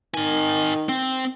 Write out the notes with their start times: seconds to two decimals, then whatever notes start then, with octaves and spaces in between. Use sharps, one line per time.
0.14 D#3 A#4 G#5
0.89 C4